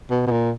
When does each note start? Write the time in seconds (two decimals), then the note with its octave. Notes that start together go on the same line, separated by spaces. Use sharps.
0.10 B2
0.27 B2
0.31 A#2